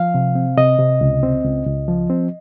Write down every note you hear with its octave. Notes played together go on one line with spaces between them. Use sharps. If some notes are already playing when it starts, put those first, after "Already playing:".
Already playing: F3 F5
C3
C4
C3 D#5
C3
C#2
C4
C#2
C#2
F3
C4